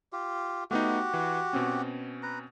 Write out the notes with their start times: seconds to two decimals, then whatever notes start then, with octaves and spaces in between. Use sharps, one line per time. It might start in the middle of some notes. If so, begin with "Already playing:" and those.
0.13 F4 G4
0.71 A3 B3 D#4 F#4 G4
1.13 E3
1.53 B2 C4 C#4
2.23 B4 A#5